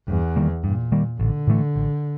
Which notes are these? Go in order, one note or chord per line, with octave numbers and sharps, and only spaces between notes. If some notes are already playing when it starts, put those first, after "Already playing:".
E2 G2
D#3 G3 A#3
G2 A#2
D#3 G3 A#3
A1 D3
A2 E3 A3
A1